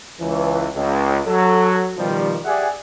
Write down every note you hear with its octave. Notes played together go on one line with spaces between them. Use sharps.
C#2 E3
C#2
F#3 A4
B2 D#3 F3 G3
G4 G#4 D5 E5 F#5 G#5